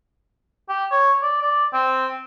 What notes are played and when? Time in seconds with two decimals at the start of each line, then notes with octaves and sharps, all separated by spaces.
0.69 G4
0.91 C#5
1.22 D5
1.42 D5
1.73 C4